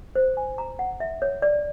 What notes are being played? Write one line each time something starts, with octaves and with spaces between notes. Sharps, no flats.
C5
G#5
A#5
F#5
E5
C#5
D5